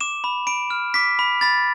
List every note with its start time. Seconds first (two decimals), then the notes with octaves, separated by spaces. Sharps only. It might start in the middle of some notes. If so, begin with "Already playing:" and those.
0.01 D6 E7
0.24 B5
0.47 B5 D7
0.70 F6
0.94 D6 B6
1.19 B5
1.41 B5 A6